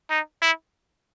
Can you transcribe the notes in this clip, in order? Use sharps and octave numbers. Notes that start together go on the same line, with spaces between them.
D#4
E4